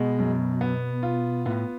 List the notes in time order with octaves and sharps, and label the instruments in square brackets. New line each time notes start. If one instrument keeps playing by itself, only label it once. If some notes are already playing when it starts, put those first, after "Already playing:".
Already playing: [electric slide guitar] B2 [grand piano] G#3
[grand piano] F#2
B3
F4
[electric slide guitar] A2 [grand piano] B3